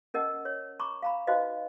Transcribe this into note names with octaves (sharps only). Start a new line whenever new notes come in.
C#4 A#4 D#5 F#5 A5
C#5
A#5 B5 C#6 D6
F5 A#5 B5
D#4 F#4 B4 C5 D#5 F5